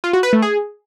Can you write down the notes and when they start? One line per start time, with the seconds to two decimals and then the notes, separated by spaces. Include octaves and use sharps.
0.04 F4
0.13 F#4
0.23 B4
0.33 A3
0.42 G#4